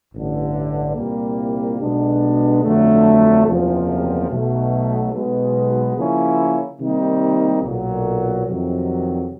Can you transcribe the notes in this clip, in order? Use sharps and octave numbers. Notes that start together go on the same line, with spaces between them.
A1 G2 D3
C2 A#2 G3 A#3
B1 B2 G#3 B3 D4
G1 F2 D3 F#3 A3
F#1 E2 C3 F3
B1 B2 F#3 A3
B1 B2 G#3 B3
C#3 F3 A#3 C#4 E4
C3 D#3 G3 A#3 D#4
B1 A#2 F#3
F2 C3 D#3 F#3